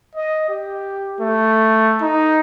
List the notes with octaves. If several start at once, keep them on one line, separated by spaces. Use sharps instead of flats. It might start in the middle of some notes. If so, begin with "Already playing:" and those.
D#5
G4
A3
D#4